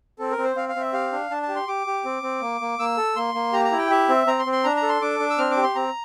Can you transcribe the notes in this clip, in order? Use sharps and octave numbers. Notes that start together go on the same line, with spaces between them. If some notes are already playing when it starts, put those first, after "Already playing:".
C4 A4
A#4
C4
C5
C4 F5
F5
C4
E5
G4 F5
D4
D4 A5
A5
G4
C6
G4 D6
G4
C4
C4
A#3
A#3
A#3 E6
A4
A#3 C6
A#3
G4 A#5
A#5
E4
G5
G4 E5
C4
C4 A#5
C6
C4
C6
D4 A#5
A#5
A4
C6
D4 D6
D4
E6
C4 F6
D6
G4
C6
C4 A#5